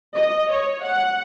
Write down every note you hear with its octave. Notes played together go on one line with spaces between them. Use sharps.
D#5
C#5
F#5